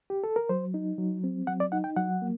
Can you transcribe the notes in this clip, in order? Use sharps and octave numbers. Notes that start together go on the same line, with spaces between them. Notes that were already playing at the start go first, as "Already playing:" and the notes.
G4
A4
A#4
F#3 C5
D#4
F#3
C4
F#3 F#5
D5
D#4 F#5
G5
F#3 F#5
A#3